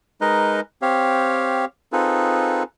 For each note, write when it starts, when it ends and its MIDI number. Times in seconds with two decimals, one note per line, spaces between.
0.21 0.60 56
0.21 0.60 63
0.21 0.60 70
0.21 0.60 71
0.21 0.60 75
0.82 1.65 60
0.82 1.65 67
0.82 1.65 73
0.82 1.65 77
1.93 2.63 60
1.93 2.63 63
1.93 2.63 65
1.93 2.63 68
1.93 2.63 69
1.93 2.63 71